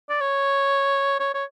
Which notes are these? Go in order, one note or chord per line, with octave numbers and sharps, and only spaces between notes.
D5
C#5
C#5
C#5